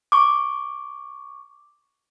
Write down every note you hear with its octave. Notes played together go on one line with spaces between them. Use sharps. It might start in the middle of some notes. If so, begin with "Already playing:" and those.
C#6 D6